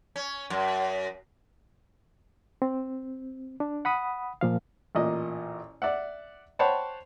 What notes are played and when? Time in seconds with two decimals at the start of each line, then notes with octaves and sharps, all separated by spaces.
0.16 C#4
0.50 F#2
2.62 C4
3.60 D4
3.85 F#5 B5 D#6
4.41 A#2 F3 F5
4.95 A1 A#2 D#5
5.82 D5 E5 F#5
6.59 C5 C#5 F#5 G5 A5 B5